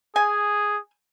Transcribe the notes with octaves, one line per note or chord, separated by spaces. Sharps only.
G#4 G#5